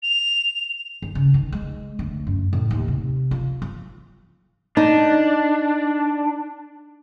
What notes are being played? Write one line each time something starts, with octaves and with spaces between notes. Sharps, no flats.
F7
D#3
C#3
D#3
G#3
D2
F#2
A2
D#2
C3
F4
F3
D4 D#4